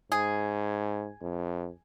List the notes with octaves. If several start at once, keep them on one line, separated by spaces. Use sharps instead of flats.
G#2 G#4
F2